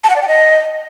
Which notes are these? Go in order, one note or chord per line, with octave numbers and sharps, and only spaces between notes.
A5
F#5
D5
G5
D#5